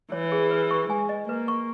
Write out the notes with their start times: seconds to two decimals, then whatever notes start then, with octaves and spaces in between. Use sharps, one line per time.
0.12 E3 C#5
0.32 G#4
0.51 B4
0.71 C#6
0.90 G#3 G#5
1.09 D#5
1.29 A#3 B4
1.48 C#6